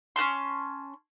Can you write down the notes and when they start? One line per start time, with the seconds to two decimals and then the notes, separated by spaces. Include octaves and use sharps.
0.16 C#4 F#4 A5 C6